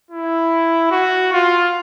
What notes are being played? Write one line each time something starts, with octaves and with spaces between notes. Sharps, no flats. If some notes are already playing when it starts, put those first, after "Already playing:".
E4
F#4
F4